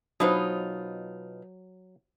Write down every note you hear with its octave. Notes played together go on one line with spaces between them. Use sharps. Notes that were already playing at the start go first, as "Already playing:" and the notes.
B2 F#3 D#4 F4 C5 D#6